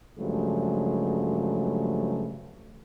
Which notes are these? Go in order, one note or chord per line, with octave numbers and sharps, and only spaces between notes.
G2 C#3 F3 F#3 G#3 A3